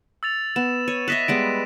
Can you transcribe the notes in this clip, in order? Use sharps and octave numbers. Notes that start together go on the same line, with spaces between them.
E6 A6 F7
B3 E7
C#5 D#7
B4 D#5 E5 A#6 B6 E7
G3 G#3 B3 D7